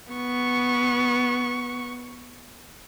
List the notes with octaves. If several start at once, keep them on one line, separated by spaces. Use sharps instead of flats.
B3 C#6